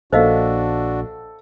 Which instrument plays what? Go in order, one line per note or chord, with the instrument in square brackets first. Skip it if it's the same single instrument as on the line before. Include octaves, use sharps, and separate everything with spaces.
[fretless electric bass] A#1 A#3 [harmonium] D4 F#4 [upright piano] A4 [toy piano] C5 D#5 F5